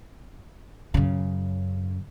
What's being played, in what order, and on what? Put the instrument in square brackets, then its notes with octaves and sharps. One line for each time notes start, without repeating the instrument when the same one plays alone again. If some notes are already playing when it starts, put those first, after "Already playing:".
[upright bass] F#2 C#3